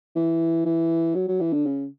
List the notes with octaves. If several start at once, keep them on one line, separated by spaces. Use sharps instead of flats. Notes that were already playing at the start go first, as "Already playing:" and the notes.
E3
E3
F#3
F#3
E3
D3
C#3